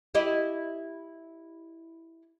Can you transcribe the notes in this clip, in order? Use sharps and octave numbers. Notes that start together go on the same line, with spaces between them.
E4 G4 D#5